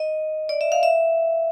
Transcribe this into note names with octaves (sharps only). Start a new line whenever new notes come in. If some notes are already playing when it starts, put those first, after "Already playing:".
Already playing: D#5
D5
E5
F5
E5